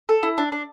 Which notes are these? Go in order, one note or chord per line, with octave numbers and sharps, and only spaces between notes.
A4
E4
D4
D4